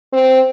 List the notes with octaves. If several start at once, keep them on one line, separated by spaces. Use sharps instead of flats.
C4